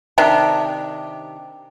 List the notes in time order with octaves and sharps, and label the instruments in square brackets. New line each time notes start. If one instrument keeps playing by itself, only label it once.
[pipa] C3 D#3 D4 G4